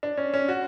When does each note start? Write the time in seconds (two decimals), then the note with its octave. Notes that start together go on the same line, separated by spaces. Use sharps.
0.03 D4
0.17 C#4
0.34 C#4
0.48 F#4